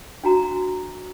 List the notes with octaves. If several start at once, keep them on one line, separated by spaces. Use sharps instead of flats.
D4 F#4 A#5